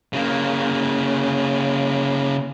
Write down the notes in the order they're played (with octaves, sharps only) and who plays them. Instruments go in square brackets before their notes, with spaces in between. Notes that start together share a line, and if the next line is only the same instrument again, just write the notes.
[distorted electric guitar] C#3 A#3